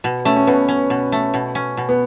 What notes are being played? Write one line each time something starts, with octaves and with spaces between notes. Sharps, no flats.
B2
A3 C#4
C#4
B2 B3
C#4
B2
A3
B2
C#4
B2
B3